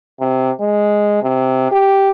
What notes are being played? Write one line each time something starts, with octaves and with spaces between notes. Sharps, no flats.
C3
G#3
C3
G4